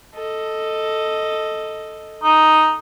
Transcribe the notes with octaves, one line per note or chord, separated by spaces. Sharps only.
A4 D#5
D#4